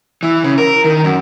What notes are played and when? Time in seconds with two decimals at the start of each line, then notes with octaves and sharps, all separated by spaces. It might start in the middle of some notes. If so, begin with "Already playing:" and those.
0.23 E3
0.44 C#3
0.58 A#4
0.84 D#3
1.04 F#2